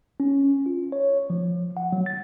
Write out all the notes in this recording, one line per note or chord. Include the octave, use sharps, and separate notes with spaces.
C#4
F4
C#5
F3
F#5
F#3
A6